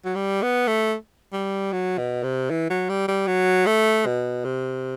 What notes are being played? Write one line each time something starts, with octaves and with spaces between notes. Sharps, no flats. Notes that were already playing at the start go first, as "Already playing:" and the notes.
F#3
G3
B3
A3
G3
F#3
B2
C3
E3
F#3
G3
G3
F#3
A3
B2
C3